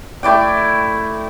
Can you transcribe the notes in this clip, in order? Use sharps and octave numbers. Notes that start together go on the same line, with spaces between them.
A3 E4 D5 G5